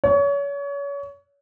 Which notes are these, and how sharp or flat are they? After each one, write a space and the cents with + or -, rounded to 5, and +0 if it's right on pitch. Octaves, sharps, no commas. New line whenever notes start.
C#5 +30